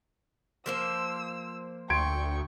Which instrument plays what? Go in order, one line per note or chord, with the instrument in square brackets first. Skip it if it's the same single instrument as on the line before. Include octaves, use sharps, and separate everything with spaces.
[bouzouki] F3 A#3 C5 [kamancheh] E6
[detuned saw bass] D2 [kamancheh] G5 C#6 [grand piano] C6 G#6 D7